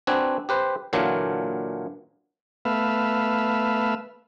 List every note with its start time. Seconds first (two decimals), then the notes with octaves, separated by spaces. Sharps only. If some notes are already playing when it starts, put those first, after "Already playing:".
0.07 C4 D4 F#4 B4 G#5
0.49 G4 B4 C5
0.93 A#2 D3 E3 F#3 D4 F4
2.65 A3 B3 B4 E5 F5